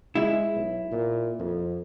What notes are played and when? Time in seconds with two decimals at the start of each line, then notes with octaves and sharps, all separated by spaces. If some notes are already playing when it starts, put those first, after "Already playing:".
0.15 G#3 E4
0.56 B1
0.92 A#2
1.39 F2